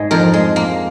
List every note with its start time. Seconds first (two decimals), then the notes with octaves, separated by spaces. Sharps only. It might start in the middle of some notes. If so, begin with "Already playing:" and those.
Already playing: G#2 G#3 G#4
0.11 F2 A#4
0.34 G#3
0.56 A#3